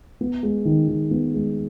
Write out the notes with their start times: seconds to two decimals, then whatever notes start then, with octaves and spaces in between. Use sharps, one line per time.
0.21 B3
0.43 G#3
0.65 D#3
0.88 D#3
1.11 B3
1.34 G#3